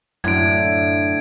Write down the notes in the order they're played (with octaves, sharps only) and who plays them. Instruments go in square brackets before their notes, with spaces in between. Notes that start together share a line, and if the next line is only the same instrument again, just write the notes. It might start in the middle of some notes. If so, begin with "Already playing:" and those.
[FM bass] F#2 [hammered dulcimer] A2 D3 [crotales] G#6 D7